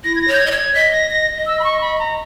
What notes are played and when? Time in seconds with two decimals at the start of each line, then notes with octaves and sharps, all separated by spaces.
0.04 E4 A#6
0.16 G#6
0.21 A#6
0.28 C#5
0.33 G6
0.40 G#6
0.46 D#5
0.51 C#5
0.57 G#6
0.74 D#5 B6
0.93 A#6
1.11 A#6
1.46 E6
1.59 B5
1.64 C#6
1.81 B5
1.99 A#5